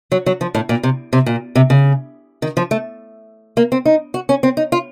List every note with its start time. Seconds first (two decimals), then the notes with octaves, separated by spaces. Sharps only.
0.12 F#3
0.26 F#3
0.41 F3
0.55 A2
0.69 A#2
0.83 C3
1.13 C3
1.26 A#2
1.55 C3
1.70 C#3
2.42 D#3
2.57 F3
2.71 A3
3.57 A#3
3.72 C4
3.85 D#4
4.14 F#4
4.29 C#4
4.43 C4
4.57 D#4
4.72 F4